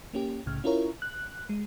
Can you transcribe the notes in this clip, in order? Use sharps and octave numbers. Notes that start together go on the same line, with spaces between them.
A#3 C#4 G4
C2 A2 C#3 F6
C#4 E4 F4 A#4 C#5
F#6
G#3